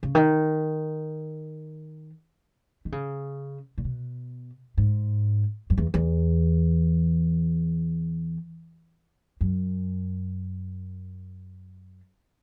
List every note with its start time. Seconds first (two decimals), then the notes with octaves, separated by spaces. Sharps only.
0.03 C#3
0.15 D#3
2.85 D#3
2.92 C#3
3.78 A#2
3.84 B2
4.78 G#2
5.70 F#2
5.78 E2
5.94 E2
9.41 F#2